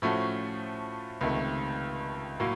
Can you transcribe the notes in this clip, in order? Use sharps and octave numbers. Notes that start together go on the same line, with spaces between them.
A2 F3 A3 C#4 F#4
C#2 C3 D#3 A3
A2 F#3 A#3